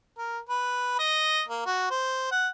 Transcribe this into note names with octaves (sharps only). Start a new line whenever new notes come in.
A#4
B4
D#5
A#3
F#4
C5
F#5